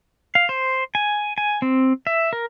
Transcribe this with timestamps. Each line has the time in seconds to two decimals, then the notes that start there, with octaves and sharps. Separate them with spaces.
0.35 F5
0.49 C5
0.95 G#5
1.38 G#5
1.62 C4
2.07 E5
2.33 A#4